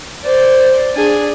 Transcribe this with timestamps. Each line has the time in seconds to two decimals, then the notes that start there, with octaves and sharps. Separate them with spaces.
0.23 C5 D5
0.95 D4 G#4